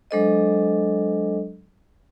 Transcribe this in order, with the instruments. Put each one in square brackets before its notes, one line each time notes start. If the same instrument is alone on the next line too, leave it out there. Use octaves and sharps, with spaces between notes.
[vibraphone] F#3 G#3 D4 A4 C5 D#5